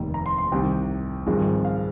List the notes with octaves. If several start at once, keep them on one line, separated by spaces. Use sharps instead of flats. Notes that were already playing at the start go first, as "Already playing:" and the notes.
Already playing: F1 D#2 D#3
A#5
C6
C6
C2 C3 D#3 G5
G#1 G2 F3 G#3 C4
F5